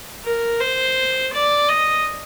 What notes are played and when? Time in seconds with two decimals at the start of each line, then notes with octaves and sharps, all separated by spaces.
0.24 A#4
0.60 C5
1.33 D5
1.68 D#5